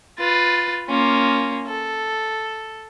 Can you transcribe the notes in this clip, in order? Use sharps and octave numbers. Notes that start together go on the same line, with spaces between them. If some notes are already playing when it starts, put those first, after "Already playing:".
F4 B4 A6
A#3 C#4 F4
A4